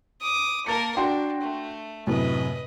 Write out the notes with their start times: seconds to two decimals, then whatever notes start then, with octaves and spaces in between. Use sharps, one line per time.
0.22 D6 D#6
0.66 A#3 A#4 A5 A6 C#7
0.97 D4 F#4 G5 C6
1.41 A3
2.07 F#2 A2 C3 B4 D#5